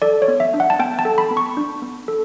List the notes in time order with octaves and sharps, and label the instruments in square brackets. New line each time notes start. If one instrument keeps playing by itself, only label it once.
[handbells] A4 D5
C#5
B3
E5
D4
F#5
A5
B3 G5
A5
A4
B5
B3
C#6
D4
B3
A4